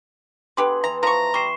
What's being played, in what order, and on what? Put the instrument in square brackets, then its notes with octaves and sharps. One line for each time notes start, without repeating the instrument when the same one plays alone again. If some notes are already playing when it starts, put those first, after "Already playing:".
[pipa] D3 G4 B4 [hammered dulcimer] B3 G#4 G5 [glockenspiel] C6
[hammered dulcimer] E3 A5 [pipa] A#5
[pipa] F3 C#6 [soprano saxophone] A#5
[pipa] G3 [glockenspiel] C#6 C7 E7